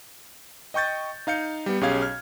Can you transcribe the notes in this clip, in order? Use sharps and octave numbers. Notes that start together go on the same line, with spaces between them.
D#5 G5 C#6 G6 A6
D#4 F5 G6 C#7
G3 B3
B1 C#4 G4 G#4 F5 G#6
F6